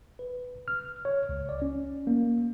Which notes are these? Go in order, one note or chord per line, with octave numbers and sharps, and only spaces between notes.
B4
F6
C#5
C#2
D5
C#4
A#3